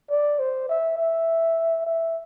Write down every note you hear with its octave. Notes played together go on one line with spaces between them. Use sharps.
D5
C5
E5
E5
E5